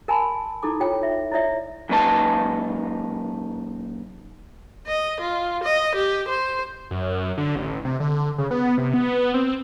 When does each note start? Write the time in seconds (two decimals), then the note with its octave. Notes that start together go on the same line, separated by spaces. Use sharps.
0.08 A#4 G#5 A5 B5 C6
0.63 D#4 E4 A4 D6
0.80 F4 C#5 G5
1.03 E5
1.31 E4 C#5 D5 E5
1.89 F#2 A#2 D#4 B4 A5
4.87 D#5
5.20 F4
5.64 D#5
5.95 G4
6.28 C5
6.91 F#2
7.38 D3
7.56 A1
7.85 C3
8.00 D3
8.38 C#3
8.51 B3
8.78 C3
8.94 B3
9.34 C4